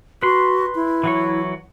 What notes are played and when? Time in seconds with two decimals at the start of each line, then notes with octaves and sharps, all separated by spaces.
0.23 F#4 B4 C6
0.75 E4
1.04 E3 F#3 C#5